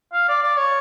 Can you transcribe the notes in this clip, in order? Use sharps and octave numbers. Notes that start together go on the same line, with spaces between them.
F5
D5
D5
C#5